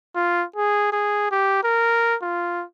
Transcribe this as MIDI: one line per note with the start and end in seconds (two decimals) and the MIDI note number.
0.15 0.44 65
0.56 0.92 68
0.93 1.28 68
1.31 1.63 67
1.64 2.15 70
2.22 2.64 65